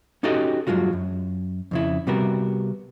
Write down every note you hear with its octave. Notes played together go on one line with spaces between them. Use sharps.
C#4 D#4 F#4 G4 A4 D#5
G2 E3 F#3 G#3 F4 F#4
F#2
F2 C#3 E4
C3 G3 B3 F#4 A#4